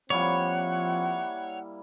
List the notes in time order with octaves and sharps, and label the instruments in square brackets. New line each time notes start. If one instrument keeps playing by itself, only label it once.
[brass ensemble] F3 C4 [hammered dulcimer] G3 A#3 E4 [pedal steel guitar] C#5 [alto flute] F#5